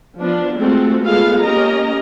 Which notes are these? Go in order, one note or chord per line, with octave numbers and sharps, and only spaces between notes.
F3 B3 D4
G#3 A3 C4 F4 F#4 A4
G#3 B3 F4 G#4 A4 F5
A#3 C#4 G4 A#4 D#5 A#5